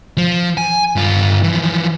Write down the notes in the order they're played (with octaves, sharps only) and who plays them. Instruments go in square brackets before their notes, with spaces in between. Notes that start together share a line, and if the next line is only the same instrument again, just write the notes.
[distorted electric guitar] F3
G#5
G2 F4
E3 F3